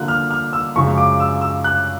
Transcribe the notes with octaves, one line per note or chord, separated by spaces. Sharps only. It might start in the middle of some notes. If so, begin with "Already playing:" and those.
Already playing: D3 F3 A#3 F#6
F6
F6
E6
F#2 C#3 F3 G#3 C#6
D6
E6
E6
F#6